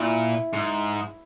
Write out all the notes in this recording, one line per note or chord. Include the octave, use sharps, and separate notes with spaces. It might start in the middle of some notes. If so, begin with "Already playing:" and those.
Already playing: A#2 E4 E5
G#2